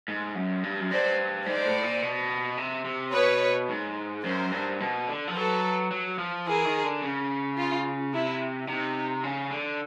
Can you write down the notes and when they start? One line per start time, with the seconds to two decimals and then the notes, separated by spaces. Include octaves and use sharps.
0.08 G#2
0.35 F#2
0.63 G2
0.79 F#2
0.91 G2 C5 D5
1.46 G#2 C5 D5
1.65 A2
1.83 A#2
2.02 B2
2.57 C3
2.85 C3
3.13 B2 B4 C#5
3.69 G#2
4.24 F#2 A#4 C5
4.51 G2
4.80 B2
5.08 D3
5.27 F3
5.35 F#3 A4 B4
5.91 F#3
6.19 F3
6.46 E3 G#4 A#4
6.65 D#3
6.84 D3
7.02 C#3
7.57 F4
8.13 C3 E4
8.68 C3 D#4
9.24 C#3
9.51 D3